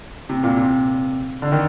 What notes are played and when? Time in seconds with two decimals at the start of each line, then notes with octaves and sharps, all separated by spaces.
0.29 C3
0.43 A#2
0.57 C3
1.42 D3
1.52 D#3